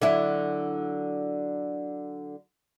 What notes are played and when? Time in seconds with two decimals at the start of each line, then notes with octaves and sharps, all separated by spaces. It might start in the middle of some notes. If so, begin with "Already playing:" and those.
0.01 D3 F#3 E4